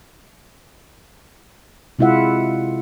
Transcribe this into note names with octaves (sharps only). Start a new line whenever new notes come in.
C3 G#3 E4 F4 E5 F#5